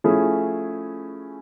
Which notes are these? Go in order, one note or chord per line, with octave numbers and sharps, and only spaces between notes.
F3 A3 C#4 E4 G#4